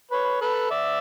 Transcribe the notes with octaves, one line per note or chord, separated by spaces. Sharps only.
B4 C#5
A4 B4
D5 E5